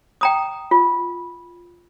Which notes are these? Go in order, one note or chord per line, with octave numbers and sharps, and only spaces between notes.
G5 A#5 D#6
F4